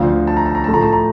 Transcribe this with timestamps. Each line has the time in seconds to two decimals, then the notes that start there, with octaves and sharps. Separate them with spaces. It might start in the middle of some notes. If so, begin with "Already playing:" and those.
Already playing: D2 D3 F3 F5
0.27 A5
0.37 A#5
0.46 A5
0.55 A#5
0.64 A2 F3 A3 A5
0.74 A#5
0.82 A5
0.93 A#5